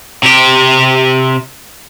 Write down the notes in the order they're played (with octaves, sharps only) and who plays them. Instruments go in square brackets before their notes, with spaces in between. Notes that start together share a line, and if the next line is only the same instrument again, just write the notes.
[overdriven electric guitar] C3 G4